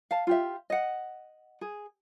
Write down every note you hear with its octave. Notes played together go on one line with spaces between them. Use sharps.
F5 A5
F4 G4 E5
D#5 F#5
G#4